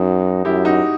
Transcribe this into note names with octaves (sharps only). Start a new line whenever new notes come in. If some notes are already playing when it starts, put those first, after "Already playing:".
Already playing: F#2 D#4 F#4
F#2 E4 G4
D#4 F#4